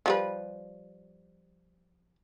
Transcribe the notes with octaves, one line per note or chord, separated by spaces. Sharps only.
F3 G3 B4